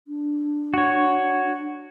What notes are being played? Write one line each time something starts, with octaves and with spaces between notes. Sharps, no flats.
D4
F#4 C#5